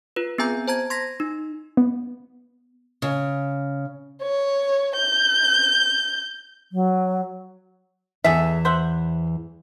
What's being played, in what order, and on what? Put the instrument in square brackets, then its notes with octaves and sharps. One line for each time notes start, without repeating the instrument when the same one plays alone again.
[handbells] F4 B4
B3 C4 G#4 G#5 A#5 G6
C5 A5 A#5 G#6
C6 G#6 A#6 B6
D#4
[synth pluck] B3
[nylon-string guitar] C#3
[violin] C#5
G6
[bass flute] F#3
[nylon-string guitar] E2 E3 [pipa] G#4 A4 E5
[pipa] C5 E5 F#5